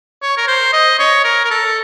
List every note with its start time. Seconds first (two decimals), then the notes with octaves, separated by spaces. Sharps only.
0.22 C#5
0.37 A#4
0.47 C5
0.73 D#5
0.99 C#5
1.24 A#4
1.45 A#4
1.51 A4